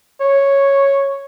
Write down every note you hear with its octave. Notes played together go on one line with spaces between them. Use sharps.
C#5